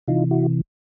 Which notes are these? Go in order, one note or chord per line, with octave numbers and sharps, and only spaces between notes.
C3 E3 D#4 F4
E4 F#4